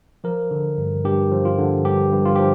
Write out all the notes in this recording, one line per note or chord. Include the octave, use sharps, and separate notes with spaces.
F3 A#4
D3
G2
G2 G4
F3
F4
D3
G2 G4
G2
F4
F3 G4